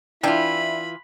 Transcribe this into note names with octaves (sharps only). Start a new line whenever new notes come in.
E3 D4 E4 F4 G5 B5